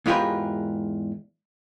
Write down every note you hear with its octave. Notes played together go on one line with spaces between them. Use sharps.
E2 G#2 F4 G4 A#4 B4